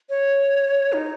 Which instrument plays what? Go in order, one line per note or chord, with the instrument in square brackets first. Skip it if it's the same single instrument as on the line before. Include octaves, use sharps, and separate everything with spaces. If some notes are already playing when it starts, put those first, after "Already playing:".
[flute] C#5
D#4